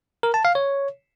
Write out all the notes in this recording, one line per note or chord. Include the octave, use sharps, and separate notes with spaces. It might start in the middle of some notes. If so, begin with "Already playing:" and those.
A#4
A5
F5
C#5